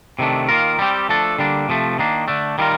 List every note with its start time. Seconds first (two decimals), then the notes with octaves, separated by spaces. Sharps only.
0.19 C3 D#3 A3 D4
0.48 D#3 A#3 F4 A#4
0.79 G3 C4 G4
1.09 F3 A3 D4 A4
1.38 D3 G3 A#3 D4
1.69 C3 F3 A3
1.99 D#3 A#3 D4
2.28 D3 A3 D4
2.58 D#3 G3 D4 F4 A#4